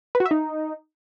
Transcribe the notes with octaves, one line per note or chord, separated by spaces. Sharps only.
B4
F#4
E5
D#4